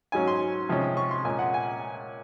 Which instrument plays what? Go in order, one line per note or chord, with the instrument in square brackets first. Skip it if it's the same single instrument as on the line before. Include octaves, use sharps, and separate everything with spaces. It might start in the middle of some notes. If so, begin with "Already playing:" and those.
[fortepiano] G#2 F#3 C#4 G#5
C6
C3 F3 G#3 C#4
C#6
C6
A#2 G#3 C#4 G#5
F#5
G#5